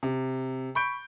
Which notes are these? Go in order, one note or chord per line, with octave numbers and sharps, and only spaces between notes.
C3
B5 C#6 G6 D7